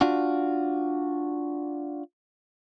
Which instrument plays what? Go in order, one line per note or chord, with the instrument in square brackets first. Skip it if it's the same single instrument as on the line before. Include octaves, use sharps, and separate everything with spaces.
[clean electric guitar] D4 F4 F#4